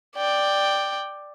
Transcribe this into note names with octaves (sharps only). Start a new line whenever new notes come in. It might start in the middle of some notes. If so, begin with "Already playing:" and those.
D5 G5